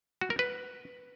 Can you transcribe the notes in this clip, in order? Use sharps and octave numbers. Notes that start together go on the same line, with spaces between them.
F#4
A#4
B4